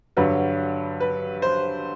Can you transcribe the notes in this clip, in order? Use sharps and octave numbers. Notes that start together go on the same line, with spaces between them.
G2 D3 F#3 B4
B4
C5